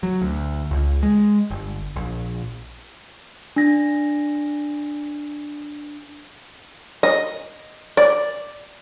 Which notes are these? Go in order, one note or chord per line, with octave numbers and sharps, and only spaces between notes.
F#3
D2
C#2
G#3
G1
A#1
D4 A#6
D#5
D5